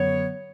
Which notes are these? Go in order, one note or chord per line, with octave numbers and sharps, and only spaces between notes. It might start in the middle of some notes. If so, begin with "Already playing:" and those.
Already playing: F#2 D3 F#3 B3 C#5